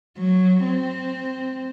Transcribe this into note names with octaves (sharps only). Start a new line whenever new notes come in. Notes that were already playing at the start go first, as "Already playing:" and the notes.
F#3
C4